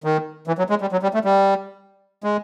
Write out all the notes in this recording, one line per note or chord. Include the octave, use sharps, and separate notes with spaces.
D#3
E3
F#3
G#3
G3
F#3
G3
A3
G3
G#3